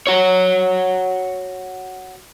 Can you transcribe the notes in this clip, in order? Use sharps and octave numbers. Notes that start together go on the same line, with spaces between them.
F#4 C#5